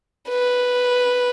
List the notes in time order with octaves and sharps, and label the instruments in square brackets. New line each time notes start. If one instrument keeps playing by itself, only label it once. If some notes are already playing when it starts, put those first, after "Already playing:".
[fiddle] B4